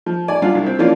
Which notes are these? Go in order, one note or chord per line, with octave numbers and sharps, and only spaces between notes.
F3
D5 G#5
G2 F#3 D4 F4
C2
C4
E3 F3 A#3 C#4 D4 F4